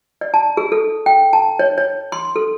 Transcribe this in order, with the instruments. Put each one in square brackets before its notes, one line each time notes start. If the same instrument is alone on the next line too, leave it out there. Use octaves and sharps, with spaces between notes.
[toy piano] D5
A5
G#4
A4
G5
A5
C#5
C#5
C6
A4